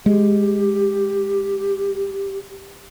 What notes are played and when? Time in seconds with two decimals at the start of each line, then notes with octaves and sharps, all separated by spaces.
0.06 G#3 G4